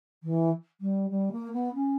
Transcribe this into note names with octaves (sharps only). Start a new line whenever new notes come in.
E3
G3
G3
A#3
B3
C#4